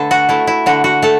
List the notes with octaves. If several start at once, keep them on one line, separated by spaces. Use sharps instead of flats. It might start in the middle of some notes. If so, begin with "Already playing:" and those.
Already playing: D3 A3 A4 B4
F#4
A3 E4
E4
D3 F#4
F#4
A3 A4